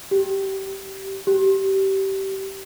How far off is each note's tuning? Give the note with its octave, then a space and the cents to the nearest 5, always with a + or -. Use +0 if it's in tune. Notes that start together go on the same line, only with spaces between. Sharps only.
G4 -20
G4 -25